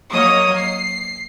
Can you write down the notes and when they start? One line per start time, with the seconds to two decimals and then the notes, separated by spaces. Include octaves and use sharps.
0.12 F#3 A#3 C#5 D#5 D#6
0.56 C7